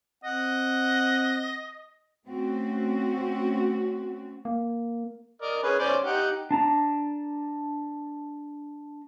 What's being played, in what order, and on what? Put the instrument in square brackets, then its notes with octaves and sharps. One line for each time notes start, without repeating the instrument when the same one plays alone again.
[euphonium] C4 [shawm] D#5 [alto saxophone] F#5
[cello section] A3 C4 C#4 F#4
[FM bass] A#3
[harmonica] A#4 D5 D#5
C#4 G#4 B4
C#4 C5 D5
D#4 G4 F#5
[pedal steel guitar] D4 A5 A#5